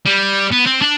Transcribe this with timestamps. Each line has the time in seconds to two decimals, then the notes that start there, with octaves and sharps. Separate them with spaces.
0.06 G3
0.52 B3
0.66 C4
0.82 D4